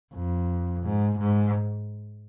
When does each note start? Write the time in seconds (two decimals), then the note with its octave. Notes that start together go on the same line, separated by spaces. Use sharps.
0.14 F2
0.83 G#2
1.18 G#2